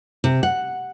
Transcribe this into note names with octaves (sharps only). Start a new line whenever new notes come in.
C3
F#5